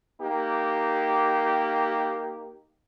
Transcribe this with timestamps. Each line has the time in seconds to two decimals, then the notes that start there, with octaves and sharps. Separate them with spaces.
0.20 A#3 D#4 G4